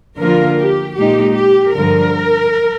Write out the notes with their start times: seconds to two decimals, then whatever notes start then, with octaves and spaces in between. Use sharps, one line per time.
0.18 D3 F3 A#3 F4 A#4
0.57 G4
0.96 A#2 G#3 D#4 G4
1.36 G4
1.74 G2 D3 F3 A#4